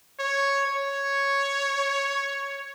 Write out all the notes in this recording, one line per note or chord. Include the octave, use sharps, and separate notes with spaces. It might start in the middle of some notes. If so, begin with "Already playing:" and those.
C#5
C#5